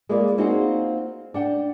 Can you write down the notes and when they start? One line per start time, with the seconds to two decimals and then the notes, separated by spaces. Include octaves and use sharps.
0.09 G#3 A#3 F4 B4 D5
0.38 A#3 C4 D#4 F4 F#4 G#4
1.34 D4 F#5 G5